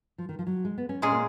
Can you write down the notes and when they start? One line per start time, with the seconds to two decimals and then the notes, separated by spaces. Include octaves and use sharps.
0.18 F3
0.29 D#3
0.39 F3
0.47 F#3
0.65 G#3
0.78 B3
0.89 C#4
1.02 A#2 G#3 C#4 G#4
1.12 A#3